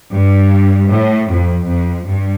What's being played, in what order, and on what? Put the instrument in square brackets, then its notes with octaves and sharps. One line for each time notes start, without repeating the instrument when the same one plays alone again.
[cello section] G2
A2
F2
F2
G2